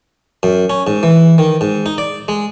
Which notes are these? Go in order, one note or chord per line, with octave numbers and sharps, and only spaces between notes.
F#2
C#4
G#2
E3
D#3
G#2
D#4
D5
G#3